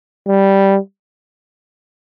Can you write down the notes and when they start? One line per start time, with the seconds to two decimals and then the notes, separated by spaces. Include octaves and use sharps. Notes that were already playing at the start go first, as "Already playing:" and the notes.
0.28 G3